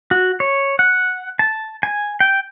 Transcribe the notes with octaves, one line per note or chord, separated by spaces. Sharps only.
F#4
C#5
F#5
A5
G#5
G5